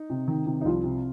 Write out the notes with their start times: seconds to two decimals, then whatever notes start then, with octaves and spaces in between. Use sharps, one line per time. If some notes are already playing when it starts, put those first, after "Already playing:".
Already playing: D#4
0.10 C3
0.28 D#3
0.46 C3
0.61 D#4
0.65 C2 F3 F4
0.84 C3